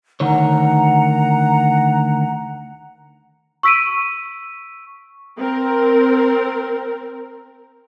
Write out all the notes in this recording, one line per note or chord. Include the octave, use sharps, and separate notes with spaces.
D2 D#3 C#5 F#5 A#5
C#6 E6 B6 D7 D#7
C4 A#4